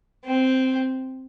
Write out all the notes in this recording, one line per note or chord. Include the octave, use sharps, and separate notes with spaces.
C4